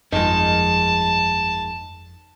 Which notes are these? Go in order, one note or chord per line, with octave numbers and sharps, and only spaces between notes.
G1 F2 D#3 F3 G#3 A5